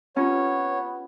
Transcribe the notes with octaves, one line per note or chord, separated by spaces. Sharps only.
B3 C#4 F4 G4 B4 C#5